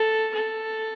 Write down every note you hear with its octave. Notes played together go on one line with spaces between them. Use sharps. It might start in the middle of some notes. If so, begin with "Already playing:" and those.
Already playing: A4
A4